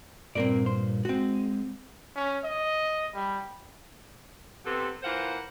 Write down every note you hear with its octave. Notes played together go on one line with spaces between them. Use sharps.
G2 A#2 A#3 C4 A#4 D5
C5
G#3 C4 F#4
C#4
D#5
G3
C3 B3 C4 G4 A4
E3 A#3 F4 C5 F#5